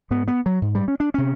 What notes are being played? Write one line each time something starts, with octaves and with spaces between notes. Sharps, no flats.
G#2 B3
B3
F#3
G#2
G3
C#4
D4
C3 C#4